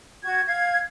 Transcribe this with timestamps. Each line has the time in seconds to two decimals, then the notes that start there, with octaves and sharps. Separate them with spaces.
0.23 F#4 G#6
0.46 F5 G#6